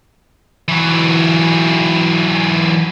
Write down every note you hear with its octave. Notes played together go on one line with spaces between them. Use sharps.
E3 F#3